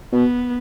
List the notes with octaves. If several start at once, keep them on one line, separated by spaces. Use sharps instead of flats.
B2 B3